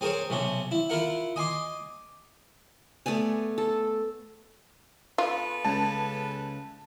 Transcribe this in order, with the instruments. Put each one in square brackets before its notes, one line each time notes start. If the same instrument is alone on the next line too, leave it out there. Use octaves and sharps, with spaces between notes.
[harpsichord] C4 G#4 A#4 C5 C#5
B1 C3 C#4 D4
E4
E4 F4 A#4 F#5
D#5 G#5 C6 D6
[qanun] A3 B3 D5 G#5
A4
[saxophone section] B3 A4 B4 [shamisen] F4
[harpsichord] C#2 C#3 G#3 [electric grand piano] A5